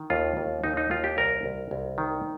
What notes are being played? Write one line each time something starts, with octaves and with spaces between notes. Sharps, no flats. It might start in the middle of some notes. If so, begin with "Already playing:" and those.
Already playing: D#3
D#2 F4
D#2
D#2 D#4
D#4
D#2 F4
G4
C2 A#4
C2
C2
D#3